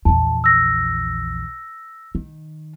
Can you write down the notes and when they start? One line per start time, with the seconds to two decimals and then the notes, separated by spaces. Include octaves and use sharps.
0.05 A#1 E2 A5
0.44 E6 A#6
2.15 D#3